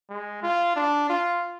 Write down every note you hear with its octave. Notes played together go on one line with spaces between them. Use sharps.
G#3
F4
D4
F4